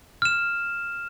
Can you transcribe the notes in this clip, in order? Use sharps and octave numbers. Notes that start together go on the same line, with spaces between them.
F6 E7